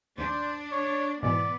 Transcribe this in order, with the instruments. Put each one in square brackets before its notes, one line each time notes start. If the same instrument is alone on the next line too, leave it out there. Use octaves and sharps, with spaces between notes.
[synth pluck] D#2 [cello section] D4 [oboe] C5
[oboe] C#5
[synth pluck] G#2 B2 E3 [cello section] B3 [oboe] D5